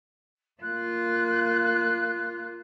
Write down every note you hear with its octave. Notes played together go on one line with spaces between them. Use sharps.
A#3 F4 F#6